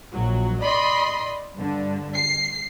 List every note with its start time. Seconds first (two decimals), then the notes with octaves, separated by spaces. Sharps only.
0.15 A#1 F#3
0.62 D5 D#5 B5 C6
1.56 G2 D3
2.14 C7